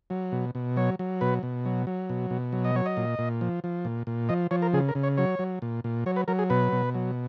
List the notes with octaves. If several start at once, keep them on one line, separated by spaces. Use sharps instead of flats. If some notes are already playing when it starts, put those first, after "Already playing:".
F#3
B2
B2
F#3 C#5
F#3
B2 B4
B2
F#3
F#3
B2
B2
F#3
D#5
F#3 C#5
D#5
A#2
A#2
F3
F3
A#2
A#2
F3 D#5
F3 C#5
A#4
C#3 G#4
A#4
C#3
C#5
F#3 C#5
F#3
A#2
A#2
F#3 C#5
B4
F#3 A#4
G#4
B2 B4
B2
F#3